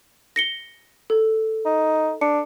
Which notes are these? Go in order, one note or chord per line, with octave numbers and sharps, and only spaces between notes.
A#6 C#7 G7
A4
D#4
D4 C#7